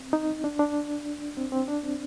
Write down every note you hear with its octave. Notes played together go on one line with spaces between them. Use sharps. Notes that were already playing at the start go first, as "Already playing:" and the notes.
Already playing: C4
D#4
D4
D4
C4
C4
D4
C4